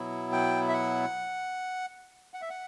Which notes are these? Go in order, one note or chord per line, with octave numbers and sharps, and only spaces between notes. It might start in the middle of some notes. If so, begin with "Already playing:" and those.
Already playing: B2 F#3 B3 E4
G5
E5
F#5
F#5
E5
F#5